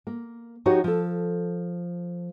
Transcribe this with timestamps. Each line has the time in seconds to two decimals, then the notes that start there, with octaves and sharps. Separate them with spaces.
0.07 A#3
0.66 F3 D#4 F#4 G4 C#5
0.84 F3 A4